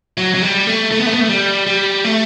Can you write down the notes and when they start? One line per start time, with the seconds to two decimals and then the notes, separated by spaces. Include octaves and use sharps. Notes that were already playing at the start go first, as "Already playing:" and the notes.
0.17 F#3
0.35 F#3
0.42 G3
0.67 A3
0.92 A3
0.99 B3
1.06 A3
1.14 B3
1.21 A3
1.29 G3
1.67 G3
2.04 A3